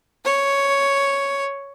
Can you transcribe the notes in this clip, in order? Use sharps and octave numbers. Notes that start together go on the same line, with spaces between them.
C#5